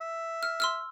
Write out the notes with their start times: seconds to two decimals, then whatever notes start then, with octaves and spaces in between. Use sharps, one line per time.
0.01 E5
0.43 F6
0.60 C6 E6 F6